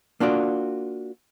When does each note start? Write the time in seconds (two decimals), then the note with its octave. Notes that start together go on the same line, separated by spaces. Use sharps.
0.20 A#3 D4 F4 F#4 D5